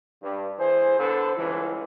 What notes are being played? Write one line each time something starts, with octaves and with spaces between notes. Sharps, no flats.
G2
E3 G#4 C5
D3 B3 A4 C5
C#2 G2 E3